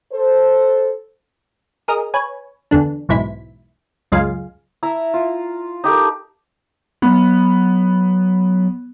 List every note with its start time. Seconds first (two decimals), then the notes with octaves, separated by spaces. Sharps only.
0.13 A4 C5
1.88 G#4 A#4 D#5
2.14 B4 C#5 G#5
2.71 E2 D3 D4
3.09 B1 E2 G#2 E4 B6
4.12 C#2 F#2 G#3 F4 F5 G#5
4.83 E4 E5 A#5
5.14 F4
5.84 D#4 G4 A4 A#4
7.02 F#3 B3